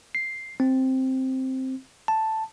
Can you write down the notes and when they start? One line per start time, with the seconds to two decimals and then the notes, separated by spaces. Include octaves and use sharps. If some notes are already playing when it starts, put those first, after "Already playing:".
0.15 C7
0.60 C4
2.08 A5